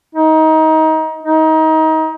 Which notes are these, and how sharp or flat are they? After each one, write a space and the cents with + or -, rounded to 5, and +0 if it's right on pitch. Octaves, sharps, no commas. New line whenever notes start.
D#4 +25
D#4 +25